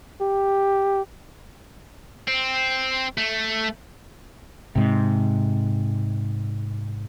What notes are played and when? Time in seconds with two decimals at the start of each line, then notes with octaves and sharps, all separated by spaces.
0.21 G4
2.28 C4
3.18 A3
4.76 G#2 C3